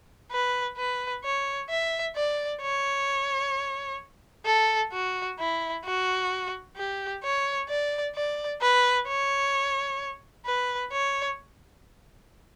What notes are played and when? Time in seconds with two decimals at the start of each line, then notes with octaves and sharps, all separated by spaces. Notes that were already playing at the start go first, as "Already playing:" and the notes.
0.32 B4
0.77 B4
1.24 C#5
1.69 E5
2.16 D5
2.62 C#5
4.46 A4
4.93 F#4
5.39 E4
5.85 F#4
6.77 G4
7.23 C#5
7.69 D5
8.15 D5
8.62 B4
9.08 C#5
10.46 B4
10.92 C#5